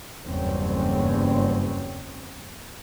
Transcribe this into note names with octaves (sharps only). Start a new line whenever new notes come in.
F#1 E2 G2 C4 C#4